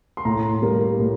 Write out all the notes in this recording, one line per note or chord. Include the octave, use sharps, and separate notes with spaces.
C6
A2 A#5
G3 A#3
A2